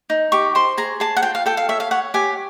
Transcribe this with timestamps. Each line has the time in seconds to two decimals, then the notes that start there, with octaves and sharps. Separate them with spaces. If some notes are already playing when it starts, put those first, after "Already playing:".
0.10 D#4
0.32 G4 C#6
0.55 C5 C6
0.78 G#4 A#5
1.00 G#4 A5
1.17 F#5
1.23 F4 G5
1.35 F5
1.46 A4 G5
1.57 F5
1.69 C#5 E5
1.80 F5
1.91 C#5 F#5
2.14 G4 G#5